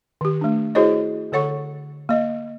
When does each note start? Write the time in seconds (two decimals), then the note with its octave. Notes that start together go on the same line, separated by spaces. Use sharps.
0.21 D#3 G4
0.41 A3 D4
0.75 E4 F#4 G#4 C5 C#5 D#5
1.32 D3 A4 C#5 F#5 C#6
2.09 A#3 D#5